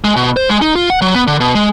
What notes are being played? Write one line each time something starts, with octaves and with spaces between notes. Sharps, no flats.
G#3
B2
C5
G#3
D#4
F4
F#5
F#3
B3
D3
B2
G#3